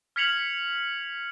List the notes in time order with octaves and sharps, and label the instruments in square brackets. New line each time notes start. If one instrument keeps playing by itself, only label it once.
[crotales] F6 G#6 B6 C#7 F7 F#7